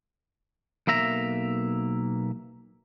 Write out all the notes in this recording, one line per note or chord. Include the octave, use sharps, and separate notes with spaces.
B1 A#3 E5 A#5